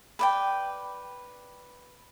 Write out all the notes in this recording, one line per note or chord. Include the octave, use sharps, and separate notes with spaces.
B4 D5 G5